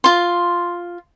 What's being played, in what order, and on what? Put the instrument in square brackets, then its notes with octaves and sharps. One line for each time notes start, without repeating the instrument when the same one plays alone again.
[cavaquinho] F4 C6